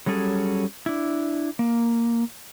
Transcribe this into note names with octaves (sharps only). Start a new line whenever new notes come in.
F#3 G3 C#4 G#4 A4
D4 E4
A#3